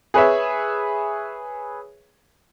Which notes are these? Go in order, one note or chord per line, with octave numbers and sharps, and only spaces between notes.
G#4 B4 C#5 E5